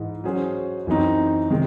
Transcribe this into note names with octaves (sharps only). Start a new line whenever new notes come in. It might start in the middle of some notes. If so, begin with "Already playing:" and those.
Already playing: G#2 E3 G#3
F#3 C#4 G#4 C5
F#2 E3 C4 D#4
C3 D#3 G#3